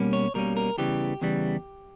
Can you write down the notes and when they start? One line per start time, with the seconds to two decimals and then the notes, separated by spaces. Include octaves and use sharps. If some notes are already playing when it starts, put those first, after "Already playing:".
Already playing: B2 G3 A#3 C#4
0.13 C#5
0.34 B2 G3 A#3 C#4 A#4
0.57 A#4
0.78 E2 C#3 E3 G3 G4
1.21 E2 C#3 E3 G3